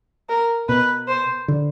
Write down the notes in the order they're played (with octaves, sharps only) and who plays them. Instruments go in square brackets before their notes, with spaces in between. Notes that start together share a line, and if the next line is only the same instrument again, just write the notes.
[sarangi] A#4
[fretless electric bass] B2 [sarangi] B4
[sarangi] C5
[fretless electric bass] D3